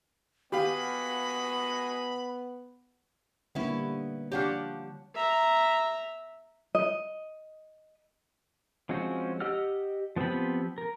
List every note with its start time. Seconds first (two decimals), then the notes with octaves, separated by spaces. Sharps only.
0.52 B3 F#4 G4 D#5 F5 G#5 B5
3.55 D3 G3 A#3 B3 C#4 E4
4.32 F3 D4 G4 C#5 F#5
5.15 E5 A#5
6.75 D#5
8.89 F3 G#3 C4 C#4 F#4
9.40 G4 D#5 F#5 E6 F6
10.16 F3 B3 C4 G4 B5
10.78 A#4